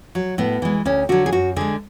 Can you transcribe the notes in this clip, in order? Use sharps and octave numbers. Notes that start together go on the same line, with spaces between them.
F#3
A2 B3
E3 G#3
D2 C#4
D3 F#3 F#4
G#4
F#2 F#4
D3 G#3 G#4